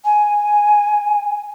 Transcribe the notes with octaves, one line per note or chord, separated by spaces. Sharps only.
G#5